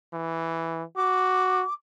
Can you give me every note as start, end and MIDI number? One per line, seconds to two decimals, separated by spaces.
0.14 0.84 52
0.97 1.63 66
0.97 1.73 86